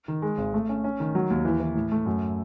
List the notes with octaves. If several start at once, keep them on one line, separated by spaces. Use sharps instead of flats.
D#3
G#3
G#1
A3
C#4
C#4
D#3
F#3
D#2
E3
E3
A2
A3
F#2